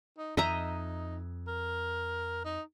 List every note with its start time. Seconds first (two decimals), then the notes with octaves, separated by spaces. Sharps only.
0.18 D#4
0.37 F2 D#4 D#5 E5 A#5
1.48 A#4
2.45 D#4